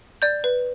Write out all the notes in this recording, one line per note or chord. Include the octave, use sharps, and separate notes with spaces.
D5 G6
B4